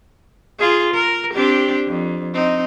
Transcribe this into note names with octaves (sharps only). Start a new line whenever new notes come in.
F4 G#4
A#4
C4 D4 G4
F2
C4 D#4